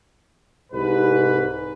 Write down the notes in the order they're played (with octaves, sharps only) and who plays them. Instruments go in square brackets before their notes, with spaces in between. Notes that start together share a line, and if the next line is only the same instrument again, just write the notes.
[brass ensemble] C2 G#2 B4